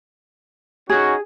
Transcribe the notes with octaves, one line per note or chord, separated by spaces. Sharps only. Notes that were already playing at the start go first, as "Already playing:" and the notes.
C#4 D#4 F#4 G#4